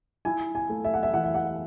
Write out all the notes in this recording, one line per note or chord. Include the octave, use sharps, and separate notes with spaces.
E4 G#5
G#5
A3
E5
F#5
E5
E3 F#5
E5
F#5